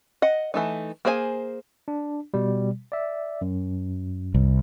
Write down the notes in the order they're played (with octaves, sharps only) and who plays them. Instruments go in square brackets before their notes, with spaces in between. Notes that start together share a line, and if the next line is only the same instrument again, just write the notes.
[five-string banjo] D#5 F#5
E3 A3 D#4
A#3 G#4 C5 D5 G#5
[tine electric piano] D4
B2 G3
D5 E5
F#2
[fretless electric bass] C2